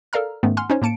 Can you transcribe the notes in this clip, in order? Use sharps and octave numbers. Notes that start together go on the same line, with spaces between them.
A4 A#4 D5 F5 A#5 F6
G#2 D#3 A3 B3 C#4
F#5 G#5 C6 F6
C#4 D#4 C5 C#5
A2 A#3 A5 C#7 D7